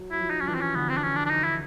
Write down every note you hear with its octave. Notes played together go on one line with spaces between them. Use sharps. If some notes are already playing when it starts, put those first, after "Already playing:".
Already playing: F#3
F#3 E4
F3
D#4
F3 C#4
E3 D4
C4
C#4
D3 B3
C4
D4
C#4
D4
D4
D#4
E4